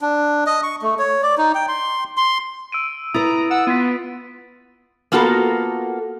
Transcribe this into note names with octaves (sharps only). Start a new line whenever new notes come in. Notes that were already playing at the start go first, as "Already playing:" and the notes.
D4
D#5
C#6
A3
C#5
D5
D#4
G5
C6
C6
E6 D7 D#7
E4 B4 A#5 D#6 A6
F#5 E6
B3 F4 B6 D#7
A#3 B3 F4 F#4 A4 A#4